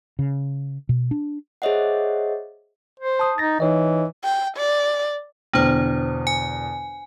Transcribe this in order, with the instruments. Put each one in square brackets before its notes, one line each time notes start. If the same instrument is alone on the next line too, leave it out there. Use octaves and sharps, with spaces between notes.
[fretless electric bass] C#3
B2
D4
[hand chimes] G#4 C5 C#5 D#5 E5 F#5
[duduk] C5
[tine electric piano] A5 D#6
[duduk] D#4 [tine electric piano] A6 A#6
[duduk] E3 [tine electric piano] D#4 C#5 D#5
[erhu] G5
D5
[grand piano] E2 B2 D3 [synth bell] D4 C5
[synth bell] G#5